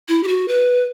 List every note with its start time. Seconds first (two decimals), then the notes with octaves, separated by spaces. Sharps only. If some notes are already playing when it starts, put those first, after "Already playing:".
0.08 E4
0.23 G4
0.28 F#4
0.48 B4